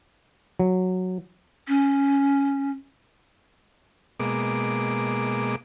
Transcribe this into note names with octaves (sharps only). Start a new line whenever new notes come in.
F#3
C#4
B2 G#3 A#3 D6